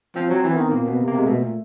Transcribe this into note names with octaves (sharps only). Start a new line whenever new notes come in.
F3 C4
F#3
C4
E3
D#3 B3
A#2 A#3
B2 B3
C3
A#3
C3 G#3
B2 A3
A#2